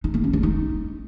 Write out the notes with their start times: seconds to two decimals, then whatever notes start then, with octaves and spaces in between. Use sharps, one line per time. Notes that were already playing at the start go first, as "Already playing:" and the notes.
0.04 D#4
0.14 A#3
0.24 C#4
0.33 D4
0.43 D#4